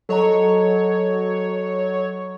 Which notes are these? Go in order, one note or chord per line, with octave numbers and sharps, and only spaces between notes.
F#3 A4 C#5 D#5 A#5